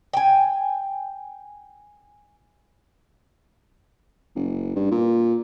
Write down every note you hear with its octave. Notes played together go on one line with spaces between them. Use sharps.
G5 G#5
F#1
G2
A#2